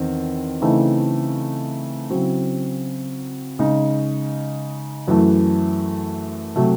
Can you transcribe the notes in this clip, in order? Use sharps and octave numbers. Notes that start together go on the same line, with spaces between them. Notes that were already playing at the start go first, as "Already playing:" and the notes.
Already playing: E2 D#3 C4
C#3 E3 A3 C4 D#4
C#3 F#3 C4 E4
C#3 G#3 D#4
F#2 E3 A3
C3 F#3 A3